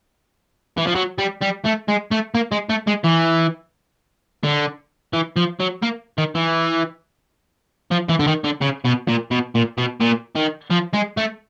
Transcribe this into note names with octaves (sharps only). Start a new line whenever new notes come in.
E3
F3
F#3
G3
G3
A3
G#3
A3
A#3
G#3
A3
G#3
E3
D3
E3
F3
F#3
A#3
D#3
E3
F3
E3
D3
D#3
D3
C#3
B2
A#2
B2
A#2
B2
A#2
D#3
F3
G#3
A3